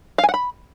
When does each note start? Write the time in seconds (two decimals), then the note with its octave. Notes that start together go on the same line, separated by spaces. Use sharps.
0.18 F5
0.24 G#5
0.29 F#5
0.34 B5